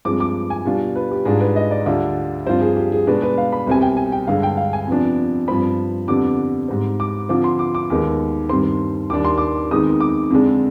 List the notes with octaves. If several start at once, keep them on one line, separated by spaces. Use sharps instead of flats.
G2 F3 G#3 C4 D6
D6
G#5
B2 G3 D4 F4
B4
G4
G#2 G3 D4 F4 G#4
B4
D#5
D5
D2 D3 G3 D4 F4
G2 F3 C4 F4 C5
G#4
G4
G#4
B2 G#3 D4 B4
B4
F5
B5
C2 B2 G3 C4 G#5
G5
G#5
G5
G2 D3 G#3 F5
G5
F5
G#5
F2 C3 F3 B3 D4
G2 F3 C4 B5
F2 D3 G3 B3 D4 D6
G#2 G3 C4
D6
D3 F3 C4 F4 D6
C6
D6
D6
D#2 D#3 G#3 B3 D#4
G2 D#3 G3 C4 C6
D#2 D#3 G3 D4 D6
C6
D6
F2 D#3 G#3 B3 D#4 D#6
D6
F2 D3 G#3 D4